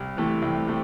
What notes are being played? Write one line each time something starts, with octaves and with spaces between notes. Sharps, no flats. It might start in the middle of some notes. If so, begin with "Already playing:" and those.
Already playing: C2
C3 E3 A3
C2
C3 A3